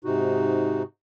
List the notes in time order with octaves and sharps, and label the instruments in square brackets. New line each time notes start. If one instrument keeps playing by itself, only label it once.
[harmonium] G#2 C3 D#4 F#4